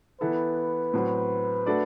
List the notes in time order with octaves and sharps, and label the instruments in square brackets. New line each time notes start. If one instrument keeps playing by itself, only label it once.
[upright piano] E3 B3 E4 A4 [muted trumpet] B4
[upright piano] A2 F#3 C4
A3 D4 F#4 A4 D5